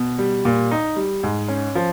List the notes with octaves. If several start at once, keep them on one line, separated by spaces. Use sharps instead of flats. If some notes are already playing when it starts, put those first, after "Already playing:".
Already playing: B2
G3
A#2
D#4
G3
G#2
C#4
F3